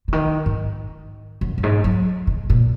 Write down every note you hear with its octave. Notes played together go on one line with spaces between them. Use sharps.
C#3
D#3
G#2
F#2
F#2
G#2
F#3
C#3
A#2